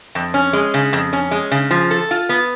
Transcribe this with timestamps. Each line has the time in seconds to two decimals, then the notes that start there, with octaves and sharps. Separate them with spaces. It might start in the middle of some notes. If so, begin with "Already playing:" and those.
0.15 F2
0.34 C#4
0.53 G#3
0.74 C#3
0.93 F2
1.13 C#4
1.31 G#3
1.51 C#3
1.71 F3
1.91 A4
2.11 F4
2.29 B3